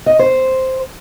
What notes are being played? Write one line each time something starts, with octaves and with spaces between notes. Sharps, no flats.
D#5
C5